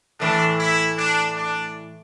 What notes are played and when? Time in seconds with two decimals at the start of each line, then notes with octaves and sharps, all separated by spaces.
0.20 A2 E3 A3 D4
0.59 E4
0.97 D4
1.36 D4